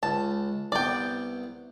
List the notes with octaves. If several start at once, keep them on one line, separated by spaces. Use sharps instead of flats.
C#2 A5
C2 B3 D5 G5